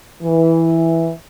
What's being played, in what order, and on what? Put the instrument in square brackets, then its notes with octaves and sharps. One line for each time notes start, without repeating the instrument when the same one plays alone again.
[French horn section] E3